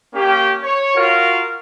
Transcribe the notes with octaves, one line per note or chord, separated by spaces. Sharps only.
A#3 C#4 G4
C#5
F4 F#4 A#4 F5